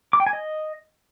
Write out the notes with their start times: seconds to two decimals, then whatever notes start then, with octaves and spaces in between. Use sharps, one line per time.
0.13 D6
0.20 G5
0.26 G#5
0.33 D#5